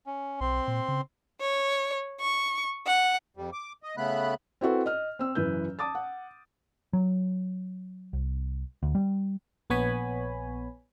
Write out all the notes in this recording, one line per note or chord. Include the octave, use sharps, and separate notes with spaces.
C#4
B1 C4 C6
A#2
C#3
C#5
C#6
F#5
F2 G3
D6
D#5
C#3 A3 B3 B5 F#6
C4 E4 F#4 A4 B4
D#5 F6
C4 E6
F#1 E3 B4 G6
A5 D6 D#6 A6
F#5
F#3
C2
D2
G3
A#1 B3 C#5 G#5 B5